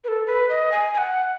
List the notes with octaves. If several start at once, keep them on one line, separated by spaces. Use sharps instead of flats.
B4
A4
B4
D#5
G#5
G#5
F#5